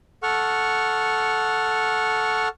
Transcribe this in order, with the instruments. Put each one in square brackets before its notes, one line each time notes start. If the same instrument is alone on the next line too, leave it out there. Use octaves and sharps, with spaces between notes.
[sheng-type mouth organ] A4 F#5 C#6 F6